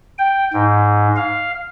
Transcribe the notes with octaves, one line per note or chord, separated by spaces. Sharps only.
G5
G#2
F5